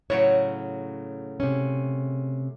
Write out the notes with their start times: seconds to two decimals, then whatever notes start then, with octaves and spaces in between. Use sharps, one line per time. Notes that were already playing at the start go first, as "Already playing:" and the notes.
0.10 A2 C#3 F#3 C#5
1.40 C3 C#4